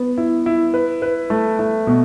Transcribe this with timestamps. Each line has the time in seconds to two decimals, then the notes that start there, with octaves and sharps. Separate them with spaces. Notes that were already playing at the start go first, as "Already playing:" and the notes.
Already playing: B3
0.18 E4
0.46 E4
0.74 B4
1.02 B4
1.30 A3
1.59 A3
1.87 B2